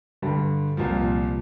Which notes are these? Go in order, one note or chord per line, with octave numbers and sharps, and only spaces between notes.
G2 D3 G3
C2 A#2 F3